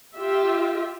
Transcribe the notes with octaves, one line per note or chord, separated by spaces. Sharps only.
F4 G4 E5